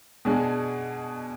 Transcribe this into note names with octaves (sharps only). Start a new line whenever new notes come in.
B2 G#3 D4 G#4